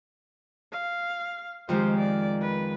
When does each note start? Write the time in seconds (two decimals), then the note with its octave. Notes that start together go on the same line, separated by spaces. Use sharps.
0.72 F5
1.69 F2 D#3 G#3 G4 C5
1.98 D5
2.41 B4